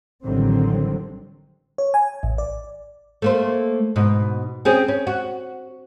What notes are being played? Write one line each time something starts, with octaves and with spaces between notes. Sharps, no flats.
A1 D3 D#3 F#3 G3 C4
C#5
G#5
A1
D5
A3 A#3 C5
G#2 B2
C4 C#4 G#4
C#4
F#4